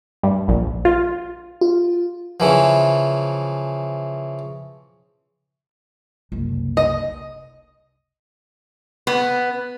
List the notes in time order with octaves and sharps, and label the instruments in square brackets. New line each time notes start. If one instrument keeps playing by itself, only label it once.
[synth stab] G2
A#1
F4
[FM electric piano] F4
[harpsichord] C#3 E3 F3
[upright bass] F#1 C2
[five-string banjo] D#5
[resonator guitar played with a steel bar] B3